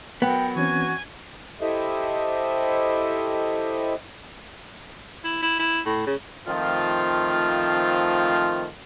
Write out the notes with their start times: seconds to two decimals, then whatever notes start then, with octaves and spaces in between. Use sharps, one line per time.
0.22 F#3 B3 A#4 F#5 G5
0.56 E3 C4 C#4 F#4 G#5
1.61 E4 G4 A4 C5 D#5 E5
5.24 E4
5.42 E4
5.59 E4
5.85 A2
6.06 C#3
6.47 D#3 F3 A3 C4 F4